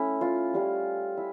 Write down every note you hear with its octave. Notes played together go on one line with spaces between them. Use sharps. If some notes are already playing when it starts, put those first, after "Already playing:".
Already playing: A3 C#4 E4
F4
G3 C#4 F4
E4